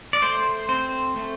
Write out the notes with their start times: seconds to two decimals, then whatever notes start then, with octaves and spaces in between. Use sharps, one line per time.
0.13 D5
0.22 A3 C5
0.69 C4 C5
1.16 A3